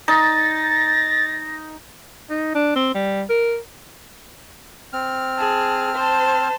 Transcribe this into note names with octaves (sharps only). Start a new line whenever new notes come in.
D#4 A6 A#6
D#4
D4
C4
G3
A#4
C4 F6
G#4 A5
C5 A5